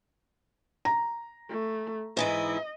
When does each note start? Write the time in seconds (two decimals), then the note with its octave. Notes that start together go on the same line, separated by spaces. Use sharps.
0.85 A#5
1.49 A3
2.17 G#2 E3 E4 D#5